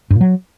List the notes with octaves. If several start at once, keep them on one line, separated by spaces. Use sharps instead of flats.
G2
A#2
F#3